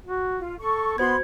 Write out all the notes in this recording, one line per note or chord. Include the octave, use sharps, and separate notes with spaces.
F#4
F4
A4 C#6
B3 F#4 C5 B5 C6 G#6